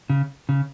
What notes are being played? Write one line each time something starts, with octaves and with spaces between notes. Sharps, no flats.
C#3
C#3